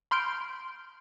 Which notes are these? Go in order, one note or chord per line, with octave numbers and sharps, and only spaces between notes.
B5 C6 F6 G6 D7